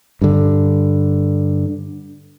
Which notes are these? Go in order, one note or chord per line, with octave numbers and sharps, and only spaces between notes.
G2 D3